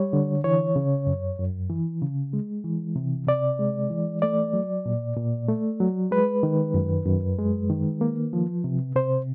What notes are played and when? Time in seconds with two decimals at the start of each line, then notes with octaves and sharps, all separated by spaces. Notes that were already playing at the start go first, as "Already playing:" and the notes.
Already playing: G3 C#5
0.13 D3
0.44 E3 C#5
0.76 C#3
1.07 F#2
1.39 F#2
1.70 E3
2.02 C#3
2.33 G#3
2.64 E3
2.96 C3
3.27 C3 D5
3.59 G#3
3.90 E3
4.22 A3 D5
4.53 F#3
4.86 A#2
5.17 A#2
5.48 A3
5.80 F#3
6.11 G#3 B4
6.43 D#3
6.74 F#2
7.06 F#2
7.38 G#3
7.70 D#3
8.01 A#3
8.33 F3
8.64 C3
8.95 C3 C5